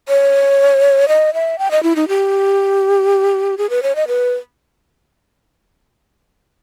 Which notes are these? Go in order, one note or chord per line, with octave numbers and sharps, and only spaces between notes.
C#5
D#5
E5
G5
D#5
E4
D#4
G4
G#4
B4
C#5
D#5
B4